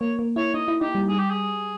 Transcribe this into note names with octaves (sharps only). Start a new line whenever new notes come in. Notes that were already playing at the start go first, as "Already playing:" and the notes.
A#3 C#5
A#3
E4 C#5
D#4 D#5
E4
D#4 G4
G3
G#4
G4
G#4